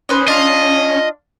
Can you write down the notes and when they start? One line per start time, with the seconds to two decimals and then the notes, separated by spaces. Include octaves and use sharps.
0.09 C#4 D#4 B4 C5
0.28 D4 F4 D#5 F5